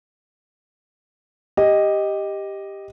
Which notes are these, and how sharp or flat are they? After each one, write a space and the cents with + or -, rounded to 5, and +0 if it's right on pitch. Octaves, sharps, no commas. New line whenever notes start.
G4 +5 D#5 +0